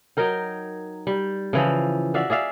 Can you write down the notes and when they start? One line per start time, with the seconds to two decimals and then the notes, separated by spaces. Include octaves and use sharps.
0.17 F#3 D#4 A#4 G5
1.07 G3
1.53 C#3 E3 F3
2.14 F#4 D5 E5 F5
2.30 G#4 D5 E5 F5